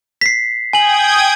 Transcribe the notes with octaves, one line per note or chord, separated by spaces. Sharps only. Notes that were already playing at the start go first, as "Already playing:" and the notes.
B6 C7
G5 G#5 D#6 G#6 F#7